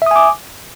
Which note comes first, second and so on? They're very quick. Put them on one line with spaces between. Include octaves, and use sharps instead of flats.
E5 D#6 G#5 D6